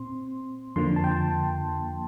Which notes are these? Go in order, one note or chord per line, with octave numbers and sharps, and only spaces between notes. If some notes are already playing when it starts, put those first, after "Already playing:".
Already playing: A#2 C4 C6
F2 D3 F3 A#3 C6
A5
G5
A5